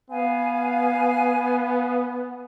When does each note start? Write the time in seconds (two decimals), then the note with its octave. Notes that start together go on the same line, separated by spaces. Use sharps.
0.11 B3 F5 G#5